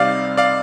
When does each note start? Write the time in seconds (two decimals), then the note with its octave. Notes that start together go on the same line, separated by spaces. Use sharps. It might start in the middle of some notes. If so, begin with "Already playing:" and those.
Already playing: C3 G3 C4 D#4 D5 F5
0.37 D5 F5